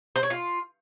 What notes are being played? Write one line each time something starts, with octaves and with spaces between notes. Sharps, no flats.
C5
C#5
F4